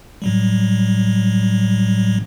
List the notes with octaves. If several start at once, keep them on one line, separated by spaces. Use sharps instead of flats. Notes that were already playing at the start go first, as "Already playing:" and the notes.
A2 F#3 G3